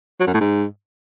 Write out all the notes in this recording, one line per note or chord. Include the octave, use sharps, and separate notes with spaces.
F#3
F#2
A2
G#2